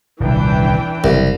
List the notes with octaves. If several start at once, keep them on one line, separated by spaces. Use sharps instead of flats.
D#1 C2 E3 D4 G5
F#1 C2